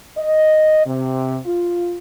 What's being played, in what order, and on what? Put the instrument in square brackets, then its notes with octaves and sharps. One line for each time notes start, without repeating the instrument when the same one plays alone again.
[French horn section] D#5
C3
F4